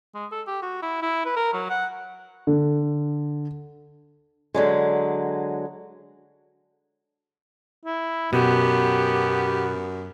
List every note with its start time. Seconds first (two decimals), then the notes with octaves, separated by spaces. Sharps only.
0.15 G#3
0.32 A4
0.47 G4
0.62 F#4
0.83 E4
1.02 E4
1.25 B4
1.37 A#4
1.53 F#3
1.70 F#5
2.47 D3
4.54 D3 F#3 G#3
7.85 E4
8.33 F#2 B2 B3 G4